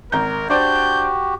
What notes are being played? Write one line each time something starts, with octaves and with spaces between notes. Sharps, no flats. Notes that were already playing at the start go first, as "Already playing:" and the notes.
G#1 A#4 A#5 G6
D4 F#4 G4 C5 D5 G6